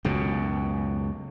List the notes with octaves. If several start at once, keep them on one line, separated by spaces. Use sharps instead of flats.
C#2 F#2 B2